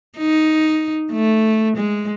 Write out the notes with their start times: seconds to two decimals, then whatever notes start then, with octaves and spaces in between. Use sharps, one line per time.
0.17 D#4
1.12 A3
1.77 G#3